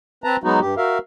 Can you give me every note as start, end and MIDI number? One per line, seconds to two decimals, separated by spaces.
0.24 0.36 60
0.24 0.36 71
0.24 0.36 81
0.24 0.36 82
0.44 0.60 54
0.44 0.60 56
0.44 0.60 59
0.44 0.60 63
0.44 0.60 66
0.60 0.75 43
0.60 0.75 67
0.77 0.98 66
0.77 0.98 70
0.77 0.98 76
0.77 0.98 77